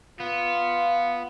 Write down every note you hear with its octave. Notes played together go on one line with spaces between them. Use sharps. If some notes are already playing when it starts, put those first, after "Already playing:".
B3 F4